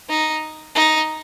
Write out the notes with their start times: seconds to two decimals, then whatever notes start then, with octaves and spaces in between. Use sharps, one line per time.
0.09 D#4
0.76 D#4